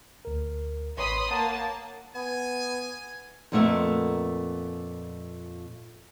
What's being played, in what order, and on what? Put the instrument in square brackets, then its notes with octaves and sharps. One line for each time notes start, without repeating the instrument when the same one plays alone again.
[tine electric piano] D2 A#4
[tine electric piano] A1 B4 C#5 [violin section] B5 C6 D#6
[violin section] A#3 A5 [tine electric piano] C#5 F#5 A#5
[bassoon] B3 [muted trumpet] G#5
[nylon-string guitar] F2 A#2 A3 B3 A#4 E5